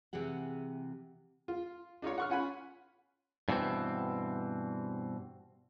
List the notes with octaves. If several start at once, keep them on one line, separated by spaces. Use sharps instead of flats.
C3 E3 G4 G#4 F#5
F4
D4 D#4 F4 C#5
F#5 C#6 F6
C#4 F4 F#5 G#5 B5
G2 B2 E3 C4